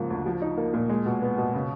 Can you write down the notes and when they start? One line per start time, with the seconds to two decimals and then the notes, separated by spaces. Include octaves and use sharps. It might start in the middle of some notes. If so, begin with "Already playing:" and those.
Already playing: G#2 C#3 F3 A#3
0.10 D2
0.26 F3
0.42 D#4
0.57 A#3
0.74 A#2
0.89 G#3
1.06 B2
1.22 B3
1.38 B2
1.54 C#3